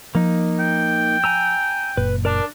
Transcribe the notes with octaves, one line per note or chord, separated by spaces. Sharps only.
F3 A#3 D#4
G5
G#5 A#5 E6
F#1 A#2 B4
D4 A#4 D5 A5